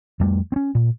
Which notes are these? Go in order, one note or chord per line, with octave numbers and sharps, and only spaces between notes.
F2 G3 A3
C4 C#4
A#2